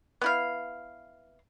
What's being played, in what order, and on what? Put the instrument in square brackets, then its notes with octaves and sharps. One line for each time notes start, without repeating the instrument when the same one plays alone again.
[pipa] B3 E4 F5